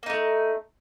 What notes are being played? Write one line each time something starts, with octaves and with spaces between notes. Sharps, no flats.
A3 A#3 D#4